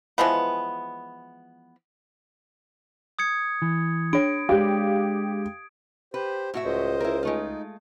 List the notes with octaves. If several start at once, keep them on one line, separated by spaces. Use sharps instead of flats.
E3 F3 G#3 B3
D#6 G#6 C#7
E3
D4 C#5 D7
G#3 D4 G4 F5
G4 B4 C5
A2 F#4 E5
C#2 C5 D#5
E4 A#4
G#3 A3 D#4 F4